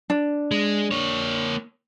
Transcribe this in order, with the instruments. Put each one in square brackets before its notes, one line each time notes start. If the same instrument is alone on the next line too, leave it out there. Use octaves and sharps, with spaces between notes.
[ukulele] D4
[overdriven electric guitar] G#3
A#3 C#5